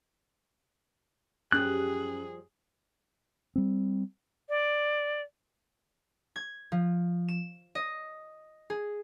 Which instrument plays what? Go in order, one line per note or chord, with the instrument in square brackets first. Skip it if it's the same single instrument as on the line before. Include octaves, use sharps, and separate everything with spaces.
[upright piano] F#2 [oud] F3 G3 G4 [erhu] G#4 [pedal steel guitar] F#6
[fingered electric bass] G3 C4
[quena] D5
[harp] G#6
F3
E7
D#5
G#4